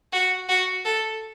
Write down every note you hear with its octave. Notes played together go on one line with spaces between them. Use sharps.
F#4
F#4
A4